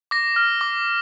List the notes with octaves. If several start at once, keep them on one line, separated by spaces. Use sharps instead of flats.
D6 A#6
F6
D6